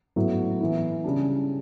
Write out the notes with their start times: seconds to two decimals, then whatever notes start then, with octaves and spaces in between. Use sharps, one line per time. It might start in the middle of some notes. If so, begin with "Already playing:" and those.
0.16 A2 F#3 B3 E4
0.60 E3 B3 E4
1.04 C#3 G3 D4